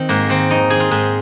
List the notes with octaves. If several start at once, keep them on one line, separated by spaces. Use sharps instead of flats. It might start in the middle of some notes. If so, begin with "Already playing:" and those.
Already playing: D#3 C4
G#2 A#3
D#3 C4
F2 D#4
D#3 G#4
F4
G#2 G#4